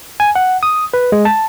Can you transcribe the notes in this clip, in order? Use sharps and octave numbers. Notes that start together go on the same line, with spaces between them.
G#5
F#5
D#6
B4
G#3
A5